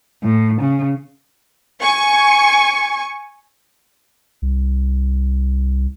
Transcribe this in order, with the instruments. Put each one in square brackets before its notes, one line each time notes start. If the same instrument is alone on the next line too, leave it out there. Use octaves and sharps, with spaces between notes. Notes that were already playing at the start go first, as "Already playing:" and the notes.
[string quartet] A2
C#3
[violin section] G#5 C#6
[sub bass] C2